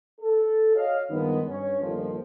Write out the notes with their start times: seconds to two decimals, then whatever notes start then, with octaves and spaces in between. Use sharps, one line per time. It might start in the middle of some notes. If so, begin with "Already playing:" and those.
0.20 A4
0.75 F#4 C#5 D#5 F5
1.10 G2 D#3 F3 G#3 B3
1.47 G2 C#4 C#5
1.81 G1 D#2 F3